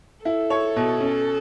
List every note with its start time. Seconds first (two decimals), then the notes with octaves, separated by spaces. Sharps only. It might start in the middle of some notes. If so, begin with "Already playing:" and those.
0.25 E4 A4
0.50 C#5
0.76 B2
1.01 C#4